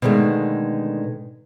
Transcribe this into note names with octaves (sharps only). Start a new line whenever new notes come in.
B2 D3 D#3 G#3 A3